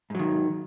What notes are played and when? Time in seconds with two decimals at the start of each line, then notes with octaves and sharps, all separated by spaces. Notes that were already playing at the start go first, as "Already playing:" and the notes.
0.10 G#2
0.15 F#3
0.19 D#3